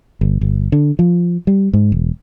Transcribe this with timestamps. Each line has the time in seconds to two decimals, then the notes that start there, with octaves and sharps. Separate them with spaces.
0.21 G1
0.41 G1
0.72 D3
0.99 F3
1.47 G3
1.73 G#2
1.92 E1